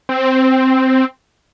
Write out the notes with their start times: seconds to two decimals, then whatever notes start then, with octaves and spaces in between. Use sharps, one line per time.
0.09 C4